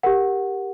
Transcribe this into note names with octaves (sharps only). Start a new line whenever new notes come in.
G4 A#4 F#5